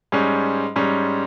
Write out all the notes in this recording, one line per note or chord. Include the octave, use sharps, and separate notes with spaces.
G#2 G3 C#4
G#2 G3 C#4